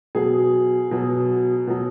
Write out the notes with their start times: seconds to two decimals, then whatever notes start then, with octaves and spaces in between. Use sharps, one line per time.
0.15 B2 F#3 G#4
0.91 B2 F#3
1.67 B2 F#3